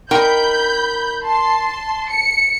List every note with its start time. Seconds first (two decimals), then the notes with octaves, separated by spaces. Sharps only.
0.11 D#4 A#4 G5 B5 G6
1.23 A5 C6
2.09 C#7